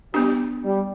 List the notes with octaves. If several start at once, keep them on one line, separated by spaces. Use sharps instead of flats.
G3 B3 D4 G4
G3